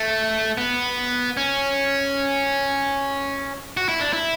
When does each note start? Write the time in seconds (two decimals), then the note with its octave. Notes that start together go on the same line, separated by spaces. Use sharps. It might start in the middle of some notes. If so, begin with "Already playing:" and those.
Already playing: A3
0.58 B3
1.37 C#4
3.77 F#4
3.89 E4
4.01 D4
4.13 E4